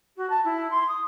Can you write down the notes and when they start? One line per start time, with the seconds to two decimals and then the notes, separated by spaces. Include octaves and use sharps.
0.16 F#4
0.29 A5
0.44 E4
0.70 C6
0.87 D#6